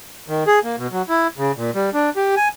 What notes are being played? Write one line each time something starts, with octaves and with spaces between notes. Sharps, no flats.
D#3
G#4
A#3
B2
F#3
E4
C#3
A#2
G3
D4
G4
G#5